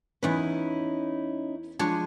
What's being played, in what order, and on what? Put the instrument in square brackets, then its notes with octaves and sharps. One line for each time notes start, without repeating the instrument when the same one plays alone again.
[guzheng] E2 B4 [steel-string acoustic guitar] C#4 D#4 E4
[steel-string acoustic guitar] F3 G#3 [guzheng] D4 C#5